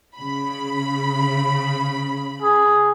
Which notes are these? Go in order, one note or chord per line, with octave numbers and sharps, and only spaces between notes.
C#3 B5
G#4